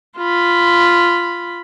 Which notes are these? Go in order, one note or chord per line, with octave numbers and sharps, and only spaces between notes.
F4 B5